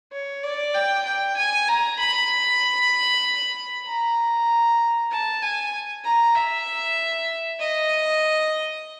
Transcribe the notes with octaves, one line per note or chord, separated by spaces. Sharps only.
C#5
D5
G5
G5
G#5
A#5
B5
A#5
A5
G#5
A#5
E5
D#5